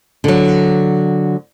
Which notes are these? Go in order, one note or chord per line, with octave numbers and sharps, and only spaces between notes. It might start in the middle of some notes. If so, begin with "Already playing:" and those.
D3 F#3